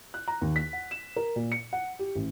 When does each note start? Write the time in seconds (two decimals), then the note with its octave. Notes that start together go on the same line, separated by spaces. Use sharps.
0.14 F#6
0.28 A#5
0.41 D#2
0.56 B6
0.73 F#5
0.91 E7
1.16 A#4
1.36 A#2
1.52 C#7
1.73 F#5
1.99 G4
2.16 A1